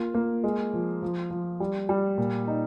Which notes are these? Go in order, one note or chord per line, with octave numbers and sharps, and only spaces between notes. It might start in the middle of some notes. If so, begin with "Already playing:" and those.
Already playing: A#3 F4
A#3
G#3
F3
F3
F3
G3
G3
A#2
D#4